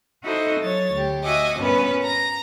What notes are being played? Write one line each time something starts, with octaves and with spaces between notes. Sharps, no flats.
D#4 E4 F#4 A4 C5 D#5
F#3 C#5 A6
D2 G4
F#4 D#5 E5 G#5 D6
G2 A#2 B3 C#4 B4
A#5 A#6